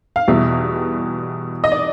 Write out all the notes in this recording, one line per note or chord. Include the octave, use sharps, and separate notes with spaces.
F5
E2 B2 G3 E5
D#5
D5